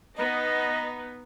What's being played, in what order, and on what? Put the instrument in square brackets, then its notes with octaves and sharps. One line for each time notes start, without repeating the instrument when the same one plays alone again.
[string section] B3 D#4 [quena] D#5